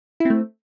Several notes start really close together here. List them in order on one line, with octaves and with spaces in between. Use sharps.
E4 C4 A3